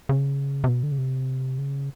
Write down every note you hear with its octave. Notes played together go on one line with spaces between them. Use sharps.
C#3
C3
B2
D3
C#3
C3
C#3